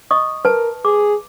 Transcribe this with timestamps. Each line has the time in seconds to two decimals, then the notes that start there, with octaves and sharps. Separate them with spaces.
0.11 D#5 C#6 D#6
0.45 A#4 B4 A5
0.85 G#4 D6